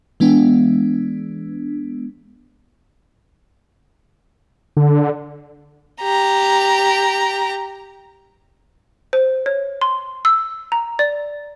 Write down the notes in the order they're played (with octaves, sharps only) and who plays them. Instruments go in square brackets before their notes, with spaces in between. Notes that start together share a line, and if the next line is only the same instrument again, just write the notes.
[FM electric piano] E3 G#3 B3 D4
[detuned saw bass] D3
[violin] G4 A#5
[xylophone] C5
C#5
C6
E6
A#5
D5